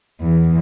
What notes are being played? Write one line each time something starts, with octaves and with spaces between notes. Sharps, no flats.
E2